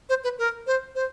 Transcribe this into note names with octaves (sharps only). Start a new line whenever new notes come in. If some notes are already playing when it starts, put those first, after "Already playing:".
C5
B4
A#4
C5
C5